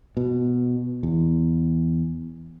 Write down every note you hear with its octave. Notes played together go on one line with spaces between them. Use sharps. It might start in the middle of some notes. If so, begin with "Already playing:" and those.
B2
E2